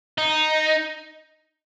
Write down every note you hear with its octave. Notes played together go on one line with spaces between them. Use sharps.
D#4